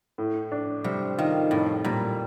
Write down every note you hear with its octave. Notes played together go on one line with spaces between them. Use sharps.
A2
D4
C3 G3
D#3 F4
F2 A2
A#2 G3